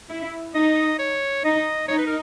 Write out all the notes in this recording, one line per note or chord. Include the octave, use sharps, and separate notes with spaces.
E4
D#4 D#5
C#5
D#4 D#5
D#4 C#5
B4
A#4